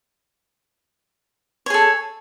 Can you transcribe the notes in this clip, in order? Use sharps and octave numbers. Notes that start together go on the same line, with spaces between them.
G#4 A4 C#5